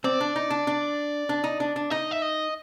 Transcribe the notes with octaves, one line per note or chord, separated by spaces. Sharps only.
C4 D5
D4
D#4
D4
D4
D4
D#4
D4
D4
D#4 D#5
E5
D#5